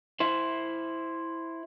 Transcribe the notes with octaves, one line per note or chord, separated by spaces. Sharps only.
E4 C5